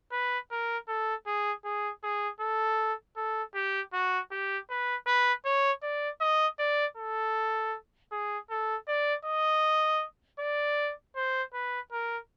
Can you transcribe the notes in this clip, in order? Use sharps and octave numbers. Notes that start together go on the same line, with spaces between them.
B4
A#4
A4
G#4
G#4
G#4
A4
A4
G4
F#4
G4
B4
B4
C#5
D5
D#5
D5
A4
G#4
A4
D5
D#5
D5
C5
B4
A#4